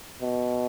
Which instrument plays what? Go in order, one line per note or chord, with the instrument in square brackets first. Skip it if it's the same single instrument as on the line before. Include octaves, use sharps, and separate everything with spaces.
[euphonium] B2